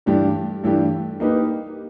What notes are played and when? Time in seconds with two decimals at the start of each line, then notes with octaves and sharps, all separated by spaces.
0.06 G2 E3 A3 D4 G4
0.64 G2 E3 A3 D4 G4
1.20 A#3 D#4 G4 B4